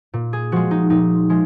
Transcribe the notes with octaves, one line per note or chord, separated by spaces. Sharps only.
A#2
G#4
F3 G#3 F#4
D#4
A#2 D#4
F3 G#3